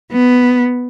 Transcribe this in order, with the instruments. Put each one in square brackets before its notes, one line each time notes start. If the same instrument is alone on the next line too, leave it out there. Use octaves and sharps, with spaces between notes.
[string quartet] B3